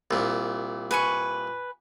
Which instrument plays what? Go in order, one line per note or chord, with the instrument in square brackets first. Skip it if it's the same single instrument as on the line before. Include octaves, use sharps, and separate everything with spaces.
[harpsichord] C2 A#2
[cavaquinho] B4 G#5 C#6